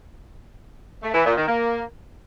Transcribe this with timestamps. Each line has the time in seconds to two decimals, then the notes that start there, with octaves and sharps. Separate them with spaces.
1.03 A3
1.14 E3
1.25 A#2
1.36 D#3
1.48 A#3